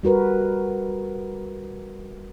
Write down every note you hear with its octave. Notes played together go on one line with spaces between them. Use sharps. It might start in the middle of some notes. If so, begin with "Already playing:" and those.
G3 F#4 A#4 B4